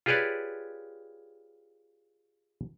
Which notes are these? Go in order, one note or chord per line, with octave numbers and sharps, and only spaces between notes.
F4 G4 G#4 B4 C#5 D5